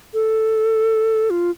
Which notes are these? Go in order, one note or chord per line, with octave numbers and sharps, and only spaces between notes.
A4
F4